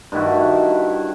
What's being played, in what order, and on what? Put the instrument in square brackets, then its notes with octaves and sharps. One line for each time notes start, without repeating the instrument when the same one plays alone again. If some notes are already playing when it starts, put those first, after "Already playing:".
[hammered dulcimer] G2 D#3 E4 F#4